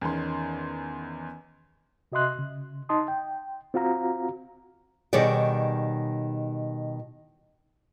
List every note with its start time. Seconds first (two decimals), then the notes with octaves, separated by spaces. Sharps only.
0.01 E2 D#3 C#4 C6
2.12 C3 F#4 D#5 E5 C6 F#6
2.39 C#3
2.89 D#4 D#5 A5 C6 D#6
3.08 G5
3.74 C4 F4 F#4 F5 A#5
5.13 B2 D#3 G3 G#4 C#5 D5